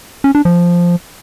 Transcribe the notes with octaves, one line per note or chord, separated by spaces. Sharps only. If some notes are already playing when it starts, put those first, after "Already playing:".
C#4
D4
F3